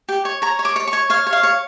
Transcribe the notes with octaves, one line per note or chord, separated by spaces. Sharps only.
G4
C#5
C#5 A#5
C#5
D6
C#5
C#6
C#5
C#5 F5
C#5
F5
C#5